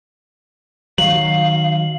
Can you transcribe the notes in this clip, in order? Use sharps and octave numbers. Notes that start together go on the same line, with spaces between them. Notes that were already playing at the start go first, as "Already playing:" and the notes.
D#3 F#3 F5 F#7